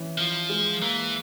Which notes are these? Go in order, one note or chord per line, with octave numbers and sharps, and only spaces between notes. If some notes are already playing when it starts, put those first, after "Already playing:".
Already playing: E3 C#4
F3 F4
G#3
E3 A#3